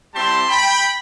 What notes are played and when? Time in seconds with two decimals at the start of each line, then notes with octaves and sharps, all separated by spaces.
0.14 G3 C4 E4 G4 A5 C6
0.49 G5 B5